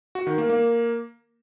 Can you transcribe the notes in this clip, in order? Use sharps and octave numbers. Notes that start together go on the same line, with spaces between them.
F#4
D#3
A#3
A#3